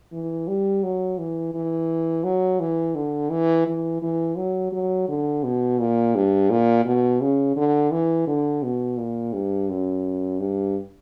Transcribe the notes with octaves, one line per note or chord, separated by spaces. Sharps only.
E3
G3
F#3
E3
E3
F#3
E3
D3
E3
E3
E3
F#3
F#3
D3
B2
A#2
G2
A#2
B2
C#3
D3
E3
D3
B2
A#2
G2
F#2
G2